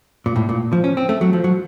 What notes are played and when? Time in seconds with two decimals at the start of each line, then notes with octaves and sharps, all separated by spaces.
0.26 A#2
0.36 A2
0.49 A#2
0.73 F3
0.84 C#4
0.97 C4
1.09 A3
1.21 F#3
1.33 F3
1.44 F#3